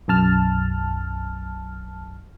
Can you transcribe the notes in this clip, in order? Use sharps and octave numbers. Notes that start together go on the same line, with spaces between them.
B1 F#2 A5 F6